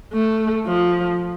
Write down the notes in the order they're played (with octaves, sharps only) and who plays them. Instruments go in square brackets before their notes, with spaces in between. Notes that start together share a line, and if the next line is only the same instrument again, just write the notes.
[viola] A3
F3